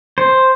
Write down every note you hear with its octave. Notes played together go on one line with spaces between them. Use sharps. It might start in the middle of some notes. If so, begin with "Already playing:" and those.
C5